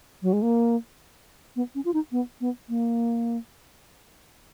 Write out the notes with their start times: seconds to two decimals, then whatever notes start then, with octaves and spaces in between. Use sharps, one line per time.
0.22 F#3
0.33 G#3
0.42 A#3
1.56 B3
1.75 C#4
1.85 F4
1.94 D#4
2.12 B3
2.41 B3
2.69 A#3